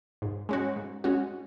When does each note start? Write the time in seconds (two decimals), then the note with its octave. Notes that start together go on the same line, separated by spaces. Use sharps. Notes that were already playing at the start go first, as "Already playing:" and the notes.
0.22 G#2
0.49 G#3 C#4 F#4
0.76 G#2
1.04 G#3 C#4 F#4